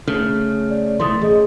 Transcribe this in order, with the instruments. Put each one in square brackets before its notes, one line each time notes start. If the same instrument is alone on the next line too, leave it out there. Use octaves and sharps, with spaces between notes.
[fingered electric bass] C#3 A3 [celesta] F6
[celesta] D5
[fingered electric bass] B1 E3 A3 [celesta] C6 D#6 A6
[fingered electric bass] A1 [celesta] G#4 D#5